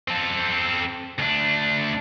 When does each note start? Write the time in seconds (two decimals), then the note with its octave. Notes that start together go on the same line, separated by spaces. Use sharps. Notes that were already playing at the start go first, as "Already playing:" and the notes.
0.08 C4 A4
1.19 D2 D4